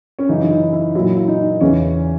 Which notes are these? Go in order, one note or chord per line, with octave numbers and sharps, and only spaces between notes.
C#4
F#2 C#3 E3 D#4
D#4
E4
E4
A#2 F#3 E4
E4
D#4
E2 C#3 E3 C#4